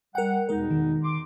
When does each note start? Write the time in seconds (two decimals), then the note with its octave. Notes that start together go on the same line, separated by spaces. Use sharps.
0.15 G3 A#4 F#5 G5
0.49 E2 B2 G#3 D#4 A#4
0.71 D#3
1.04 C6 D6